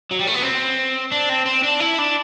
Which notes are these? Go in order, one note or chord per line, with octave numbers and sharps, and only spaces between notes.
F#3
G3
A3
B3
C4
D4
C4
C4
D4
E4
D4